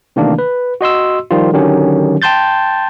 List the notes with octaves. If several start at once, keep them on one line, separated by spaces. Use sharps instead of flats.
C3 D#3 E3 A3 A#3 D4
B4
F#4 D#5 C6 E6
D#3 F3 G3 F4
D3 D#3 F#3 C#4 G4 C#5
G5 A5 C6 G6 A6